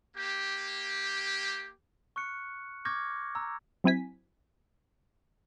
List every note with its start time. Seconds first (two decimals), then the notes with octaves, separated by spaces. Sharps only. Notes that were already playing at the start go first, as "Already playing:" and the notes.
0.17 A#3 G4
2.16 C#6 F6 F#6 C#7
2.85 C#6 D6 F6 G6 G#6 A#6
3.35 A#5 E6
3.84 F#3 C4 E4 G#5 B6